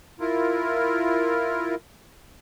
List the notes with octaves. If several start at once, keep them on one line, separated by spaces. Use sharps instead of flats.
E4 F4 A#4